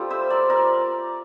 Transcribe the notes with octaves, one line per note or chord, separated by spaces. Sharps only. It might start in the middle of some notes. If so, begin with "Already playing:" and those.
Already playing: G3 C4 F4 A4
C5 E5
A#4 D5
A#4 D5